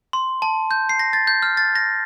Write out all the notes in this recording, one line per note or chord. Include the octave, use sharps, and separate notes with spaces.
C6
A5
G6
C7
A#6
A6
G6
F6
A6
A#6